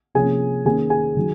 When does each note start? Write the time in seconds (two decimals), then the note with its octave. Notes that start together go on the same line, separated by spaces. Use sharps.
0.15 C3 F3 A#3 C#4 G#4 G#5
0.65 D#3 A#3 C#4 G#4 G#5
0.90 G#4 G#5
1.17 D#3 F#3